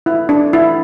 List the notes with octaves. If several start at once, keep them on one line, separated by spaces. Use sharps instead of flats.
E4
D4
E4